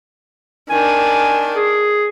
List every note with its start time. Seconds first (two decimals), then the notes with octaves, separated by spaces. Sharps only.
0.70 D#3 D4 G#5
1.56 G#4